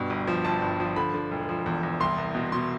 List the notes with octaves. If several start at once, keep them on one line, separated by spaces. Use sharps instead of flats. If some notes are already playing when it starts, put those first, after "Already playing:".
Already playing: G2 B2
G1
F3
G1 A5
G2
F3
D3 B5
D3
E1
F3
E2
E2
C2 C6
C2
B2
B2 C6